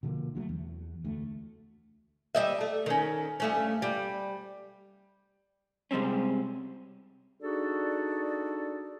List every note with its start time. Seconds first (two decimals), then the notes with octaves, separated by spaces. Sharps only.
0.03 B2 D3 F3 A#3
0.35 D3 F#3 G3 A3
0.49 E2
1.05 D2 G#3 A3
2.35 G3 D#5 E5
2.61 A3
2.86 D#3 C#4
3.40 G2 A3 C#4
3.82 G3
5.91 C3 G3 G#3 C4 C#4
7.41 D4 D#4 F#4 G#4 A4 D5